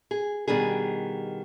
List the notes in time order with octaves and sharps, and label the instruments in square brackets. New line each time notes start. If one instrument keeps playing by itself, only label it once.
[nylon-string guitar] G#4
B2 D#3 G3 D4 G#4